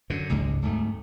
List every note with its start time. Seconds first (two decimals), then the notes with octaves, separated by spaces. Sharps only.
0.10 F#2 D3
0.30 F#1 C#2 G#2 G#3
0.62 D1 G#2 A3